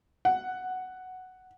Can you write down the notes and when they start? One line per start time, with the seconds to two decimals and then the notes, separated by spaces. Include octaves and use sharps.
0.25 F#5